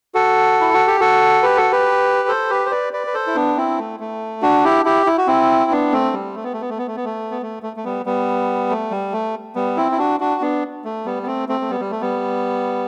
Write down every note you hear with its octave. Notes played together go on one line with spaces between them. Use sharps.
F#4 A4
E4
F#4
G4
F#4 A4
G4 B4
F#4 A4
G4 B4
A4 C5
G4 B4
C5
B4 D5
B4 D5
B4
A4 C5
E4
B3 D4
C4 E4
A3
A3
D4 F#4
E4 G4
E4 G4
E4
F#4
C4 E4
B3 D4
A3 C4
G3
A3
B3
A3
B3
A3
B3
A3
B3
A3
B3
A3
A3
A3
G3 B3
G3 B3
A3
G3
A3
G3 B3
C4 E4
E4
D4 F#4
D4 F#4
B3 D4
A3
G3 B3
B3
A3 C4
A3 C4
A3
G3 B3
G3
A3
G3 B3